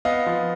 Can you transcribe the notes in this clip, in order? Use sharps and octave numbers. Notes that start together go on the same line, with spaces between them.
B3 D#5 F5
F3